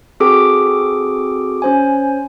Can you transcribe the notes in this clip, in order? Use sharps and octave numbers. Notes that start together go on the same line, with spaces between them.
C4 F#4 G#4 A4 D6 D7
C#4 C5 G#5